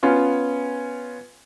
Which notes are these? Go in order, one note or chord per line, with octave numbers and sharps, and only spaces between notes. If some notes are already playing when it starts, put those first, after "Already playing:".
B3 C#4 F4